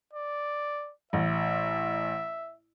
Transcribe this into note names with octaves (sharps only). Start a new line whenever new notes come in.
D5
A1 E5